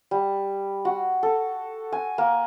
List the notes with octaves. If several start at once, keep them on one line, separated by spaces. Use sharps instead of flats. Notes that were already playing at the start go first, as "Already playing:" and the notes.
G3
F#4
A4
G#5
A#3